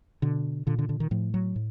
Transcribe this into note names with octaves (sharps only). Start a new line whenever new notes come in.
B2 D3
A#2 D3
D3
D3
D#3
A2 F3
F#3
A2